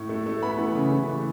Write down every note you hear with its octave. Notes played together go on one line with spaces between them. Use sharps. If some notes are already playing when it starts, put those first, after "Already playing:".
Already playing: A2
A3
A3
B3 B5
E3
C#3
E3
A3